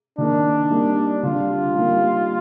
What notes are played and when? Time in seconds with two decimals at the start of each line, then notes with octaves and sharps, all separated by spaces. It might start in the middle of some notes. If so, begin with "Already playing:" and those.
0.18 D#3 A#3 D4 D#4 A#4
0.70 G3 A#3 D#4 A#4
1.23 D3 G3 D4 F4
1.75 G3 A#3 D#4 A#4